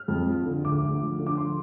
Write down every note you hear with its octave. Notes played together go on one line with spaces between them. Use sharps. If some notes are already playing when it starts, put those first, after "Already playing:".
Already playing: F6
F2
F3
D3
D2 D6
D2
F3
D3
D6
F3 C6